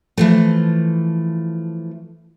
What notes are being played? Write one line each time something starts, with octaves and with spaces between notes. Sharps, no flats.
E3 F3 A3